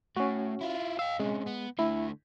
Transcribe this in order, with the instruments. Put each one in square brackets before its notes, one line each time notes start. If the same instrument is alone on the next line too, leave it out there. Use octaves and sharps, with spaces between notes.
[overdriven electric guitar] A2 [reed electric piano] C#4 F#4
[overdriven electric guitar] E4 F4
[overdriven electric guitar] D#5 F5 [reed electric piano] E6
[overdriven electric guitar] C3 C#4 [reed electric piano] G#3
[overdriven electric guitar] B3
[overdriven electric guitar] D3 A3 [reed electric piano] E4